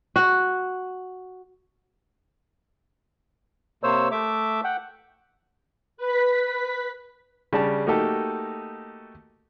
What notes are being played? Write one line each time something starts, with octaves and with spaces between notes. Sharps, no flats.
F#4
C3 A#3 C5 C#5 E6
A3 E5 D6
F#5 G5
B4 B6
C#3 G3 D4 A5
A3 A#3 D#4 F#4 G4 A4